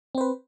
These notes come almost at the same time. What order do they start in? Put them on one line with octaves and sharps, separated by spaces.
C4 C5 B4